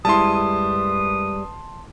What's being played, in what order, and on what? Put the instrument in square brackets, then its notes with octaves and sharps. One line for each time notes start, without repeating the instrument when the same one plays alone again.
[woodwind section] F#2 B4 D#6 [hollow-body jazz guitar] G3 G#3 E4 [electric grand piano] A5 C6